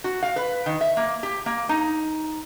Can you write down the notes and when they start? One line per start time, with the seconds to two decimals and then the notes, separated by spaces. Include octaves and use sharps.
0.04 F#4
0.23 F5
0.36 B4
0.66 D#3
0.81 E5
0.97 A#3
1.23 G4
1.46 A#3
1.69 D#4